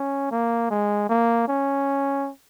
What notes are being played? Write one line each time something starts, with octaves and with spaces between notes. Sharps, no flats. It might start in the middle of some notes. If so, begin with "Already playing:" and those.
Already playing: C#4
A#3
G#3
A#3
C#4